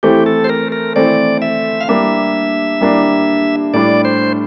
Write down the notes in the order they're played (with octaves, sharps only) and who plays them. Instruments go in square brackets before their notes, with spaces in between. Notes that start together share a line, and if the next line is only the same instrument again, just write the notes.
[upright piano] E3 A3 C4 [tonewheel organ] G4
[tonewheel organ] A4
C5
A#4
A#4
[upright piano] E3 A3 C4 [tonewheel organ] D5
[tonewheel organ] E5
F5
[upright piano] G3 A#3 D4 [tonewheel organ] E5
[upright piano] G3 A#3 D4
[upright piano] A2 G3 D4 [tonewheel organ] D5
[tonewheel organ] C5